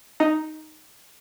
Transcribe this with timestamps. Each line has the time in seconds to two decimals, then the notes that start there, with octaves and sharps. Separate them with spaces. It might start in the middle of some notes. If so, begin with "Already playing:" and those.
0.20 D#4